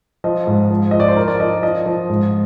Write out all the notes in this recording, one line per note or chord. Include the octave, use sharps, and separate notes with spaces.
F3 D#5
G#2
F3
F3 D#5
D5
C5
F3 A#4
D5
F3 D#5
F3 D#5
F3
G#2